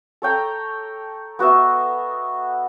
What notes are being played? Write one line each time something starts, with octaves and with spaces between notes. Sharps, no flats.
A4 C#5 G5 A#5
B3 F#4 D#5 E5